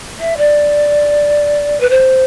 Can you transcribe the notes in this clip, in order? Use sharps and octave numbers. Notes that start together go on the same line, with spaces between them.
E5
D5
B4
C5